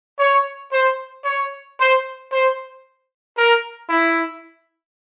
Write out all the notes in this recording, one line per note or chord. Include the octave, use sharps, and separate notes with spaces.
C#5
C5
C#5
C5
C5
A#4
E4